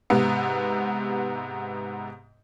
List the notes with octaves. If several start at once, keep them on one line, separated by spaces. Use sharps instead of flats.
G#2 C3 B3